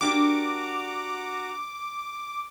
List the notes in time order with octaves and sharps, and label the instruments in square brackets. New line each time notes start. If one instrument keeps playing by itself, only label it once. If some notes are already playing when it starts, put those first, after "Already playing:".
[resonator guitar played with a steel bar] A#3 D4 G4 [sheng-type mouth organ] F#4 F#5 A#5 [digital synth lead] D6